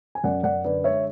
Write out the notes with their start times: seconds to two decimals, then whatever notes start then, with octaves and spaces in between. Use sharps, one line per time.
0.15 G#5
0.24 F#2 D5 F#5
0.43 F#2 D5 F#5
0.65 D3 B4 D5
0.84 G#3 C#5 E5